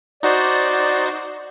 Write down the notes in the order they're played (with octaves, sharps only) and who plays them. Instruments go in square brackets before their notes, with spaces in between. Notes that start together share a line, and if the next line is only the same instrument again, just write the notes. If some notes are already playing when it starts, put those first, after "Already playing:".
[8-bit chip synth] D#4 F#4 C5 [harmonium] D5